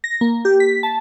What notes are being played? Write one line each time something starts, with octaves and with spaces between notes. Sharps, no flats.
A#6
A#3
G4
B6
A5